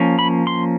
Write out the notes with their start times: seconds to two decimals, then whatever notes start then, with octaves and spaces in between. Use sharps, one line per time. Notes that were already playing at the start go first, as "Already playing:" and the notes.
Already playing: F3 A#3 C#4
0.19 B5
0.47 C6